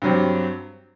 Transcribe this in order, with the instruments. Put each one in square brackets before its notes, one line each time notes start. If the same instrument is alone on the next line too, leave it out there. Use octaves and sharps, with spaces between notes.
[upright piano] G2 F#3 C4 G4